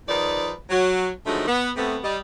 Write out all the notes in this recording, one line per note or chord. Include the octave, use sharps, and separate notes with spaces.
D#3 F3 D#4 G#4 B4 D5
F#3
D3 D#3 F3 F#3 G#3 A3
B3
C3 A3 B3
G3 D#5